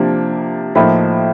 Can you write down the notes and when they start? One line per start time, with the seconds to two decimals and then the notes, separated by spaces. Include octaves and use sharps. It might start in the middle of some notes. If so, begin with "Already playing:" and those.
Already playing: C3 F3 A#3 D4
0.75 A2 F3 A#3 D#4 B5